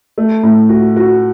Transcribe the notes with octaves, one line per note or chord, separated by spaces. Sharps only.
A3
A2
F#4
F#4